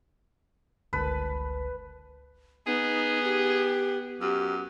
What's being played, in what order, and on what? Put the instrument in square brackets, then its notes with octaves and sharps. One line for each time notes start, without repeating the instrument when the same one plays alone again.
[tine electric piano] G1 C#2 A5 [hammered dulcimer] B4
[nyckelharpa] B3 [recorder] D#4 [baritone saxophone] G#4
[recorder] G4
[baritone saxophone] F#2 [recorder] G4